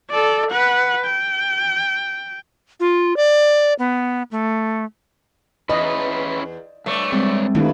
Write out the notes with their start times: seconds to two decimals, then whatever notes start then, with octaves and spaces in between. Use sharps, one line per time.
0.10 A4 D5
0.51 B4 F#5
1.06 G5
2.80 F4
3.17 D5
3.79 B3
4.31 A3
5.70 E2 C#4 E4 B4 D#5
6.86 G2 A3 C#5 D5
7.12 G3 G#3 C4
7.55 G2 D#3 A3 E4